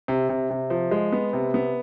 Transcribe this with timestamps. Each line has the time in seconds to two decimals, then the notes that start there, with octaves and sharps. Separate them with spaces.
0.08 C3
0.29 C3
0.50 C3
0.70 F3
0.91 G#3
1.13 B3
1.33 C3
1.54 B3